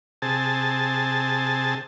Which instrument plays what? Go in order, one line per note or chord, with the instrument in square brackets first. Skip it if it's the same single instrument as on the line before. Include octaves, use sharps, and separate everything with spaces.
[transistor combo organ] C3 G#4 A5